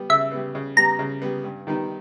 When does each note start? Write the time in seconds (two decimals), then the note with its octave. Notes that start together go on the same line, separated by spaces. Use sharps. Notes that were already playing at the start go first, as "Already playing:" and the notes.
Already playing: G3 B3
0.10 C#3 E5
0.32 G3 B3
0.55 C#3
0.77 G3 B3 A#5
0.99 C#3
1.22 G3 B3
1.44 G2
1.67 D#3 G3 B3 D#4